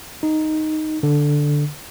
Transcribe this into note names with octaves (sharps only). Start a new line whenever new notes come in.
D#4
D3